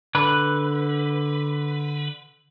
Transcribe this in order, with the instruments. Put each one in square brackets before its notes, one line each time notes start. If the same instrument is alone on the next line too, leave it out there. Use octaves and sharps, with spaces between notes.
[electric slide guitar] D3 B4